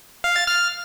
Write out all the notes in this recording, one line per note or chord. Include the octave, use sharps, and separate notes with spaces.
F5
A6
F6